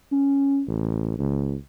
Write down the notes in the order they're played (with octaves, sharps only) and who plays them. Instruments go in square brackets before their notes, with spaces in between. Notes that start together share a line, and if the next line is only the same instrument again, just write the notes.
[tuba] C#4
A1
C#2